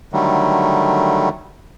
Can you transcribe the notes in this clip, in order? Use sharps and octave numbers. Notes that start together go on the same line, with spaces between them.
D3 D#3 F#3 G3 A3